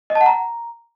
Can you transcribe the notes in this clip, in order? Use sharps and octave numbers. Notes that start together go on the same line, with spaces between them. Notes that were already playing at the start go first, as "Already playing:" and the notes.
D#5
A5
F#5
A#5